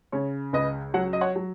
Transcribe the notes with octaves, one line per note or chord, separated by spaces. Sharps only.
C#3 C#5
C#2 B4 D#5
F#3 C#5 F#5
D#5
C#5 F#5
F#3